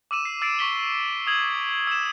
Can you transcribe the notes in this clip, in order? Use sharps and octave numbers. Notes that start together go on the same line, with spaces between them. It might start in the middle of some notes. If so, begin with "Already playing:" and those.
D6 E6 D#7 E7
C7
E6 A6 C7 D7
C#6 B6 G7
D#6 G#6 F#7
E6 E7